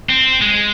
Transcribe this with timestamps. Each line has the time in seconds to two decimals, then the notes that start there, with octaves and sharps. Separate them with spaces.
0.09 C4
0.41 G#3